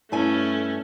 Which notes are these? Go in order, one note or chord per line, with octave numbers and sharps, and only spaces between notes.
G2 A3 C#4 E4 G#5